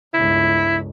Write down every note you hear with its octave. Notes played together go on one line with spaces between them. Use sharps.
G1 C#2 E4